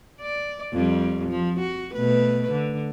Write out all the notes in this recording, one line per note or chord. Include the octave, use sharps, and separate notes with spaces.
D5
F2 G3
F3
F#4
B2 A3 B4
D3